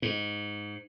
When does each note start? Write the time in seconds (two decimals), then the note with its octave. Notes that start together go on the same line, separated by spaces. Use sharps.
0.02 G#2